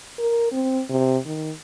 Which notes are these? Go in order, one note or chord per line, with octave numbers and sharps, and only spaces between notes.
A#4
C4
C3
D#3